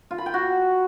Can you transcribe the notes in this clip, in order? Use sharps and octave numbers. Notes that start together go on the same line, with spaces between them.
F4
B5
G5
F#4